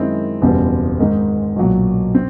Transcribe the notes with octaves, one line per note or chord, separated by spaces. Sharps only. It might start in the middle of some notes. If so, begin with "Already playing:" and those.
Already playing: F#2 D#3 G#3 C4 E4
F#1 E2 B2 G3 C4
G#2 D#3 G#3 C4 D#4
B1 A#2 F#3
C4